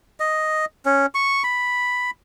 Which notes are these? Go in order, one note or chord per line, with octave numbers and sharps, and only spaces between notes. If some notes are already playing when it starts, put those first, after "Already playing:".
D#5
C#4
C#6
B5